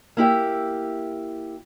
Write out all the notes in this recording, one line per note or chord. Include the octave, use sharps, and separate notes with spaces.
A#3 E4 G4 E5